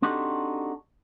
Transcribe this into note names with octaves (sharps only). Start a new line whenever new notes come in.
C4 D4 D#4 F#4 G4 A4